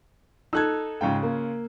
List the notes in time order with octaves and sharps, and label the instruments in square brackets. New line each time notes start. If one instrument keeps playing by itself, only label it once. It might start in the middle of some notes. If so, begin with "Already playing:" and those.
[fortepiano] D#4 A4 [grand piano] E6 F#6 G#6
[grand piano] G#2 G5 [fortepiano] C#3 F4
[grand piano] A#3